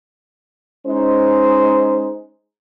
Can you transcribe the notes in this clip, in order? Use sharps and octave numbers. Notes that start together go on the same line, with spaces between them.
G#3 C#4 D#4 C5